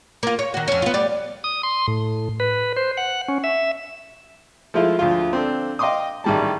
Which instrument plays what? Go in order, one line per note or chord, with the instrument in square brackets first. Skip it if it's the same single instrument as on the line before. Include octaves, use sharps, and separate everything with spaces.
[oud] A#3 F4
C#5
D#3 F#4
F2 C#4
B3 F4
G3 D5
[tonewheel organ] D#6
C6
A2
B4
C5
F#5
C#4
E5
[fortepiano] F3 G#3 A3 E4 F4 F5
D2 F3 F4
C4 D4 A4
D#5 F5 G5 C6 D6 D#6
A1 D#3 G3 G#3 A5